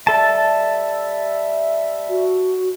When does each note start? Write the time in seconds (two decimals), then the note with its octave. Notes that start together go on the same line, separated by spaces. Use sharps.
0.07 G3 A4 E5 A5
2.09 F#4